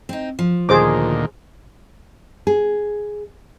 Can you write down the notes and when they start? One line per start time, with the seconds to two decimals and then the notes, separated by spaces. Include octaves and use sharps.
0.09 C4 D#4
0.39 F3
0.69 D2 A#2 D#3 G#4 C5 D6
2.47 G#4